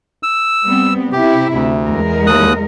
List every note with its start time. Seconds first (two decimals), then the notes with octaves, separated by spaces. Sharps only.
0.23 E6
0.63 G3 B3 C4
1.12 C3 E4 G4
1.54 D2
1.86 E2 G#3 A#4
2.27 D#2 D#6 F#6